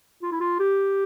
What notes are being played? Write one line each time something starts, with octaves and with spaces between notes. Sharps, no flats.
F4
E4
F4
G4